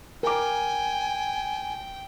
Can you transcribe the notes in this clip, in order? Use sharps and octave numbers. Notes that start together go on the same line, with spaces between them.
A#4 G5 G#5 D6